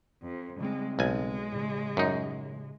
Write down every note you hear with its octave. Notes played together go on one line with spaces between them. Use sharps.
F2
C#3 G3 G#3 C4
B1 G#3 G#5
A2 C#3
F#2 D#4